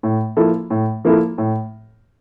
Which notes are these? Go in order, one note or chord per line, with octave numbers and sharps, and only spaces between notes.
A2
F3 A#3 E4 A4
A2
F3 A#3 E4 A4
A2